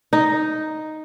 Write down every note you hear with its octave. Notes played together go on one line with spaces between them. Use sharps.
D#4